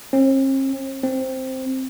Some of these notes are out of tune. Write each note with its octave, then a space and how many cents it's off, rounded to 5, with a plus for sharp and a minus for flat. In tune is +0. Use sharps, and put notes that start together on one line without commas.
C4 +45
C4 +0